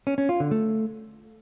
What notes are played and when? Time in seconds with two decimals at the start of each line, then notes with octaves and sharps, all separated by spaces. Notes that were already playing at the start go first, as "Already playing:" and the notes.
0.07 C#4
0.18 C#4
0.29 F4
0.40 D3
0.51 A3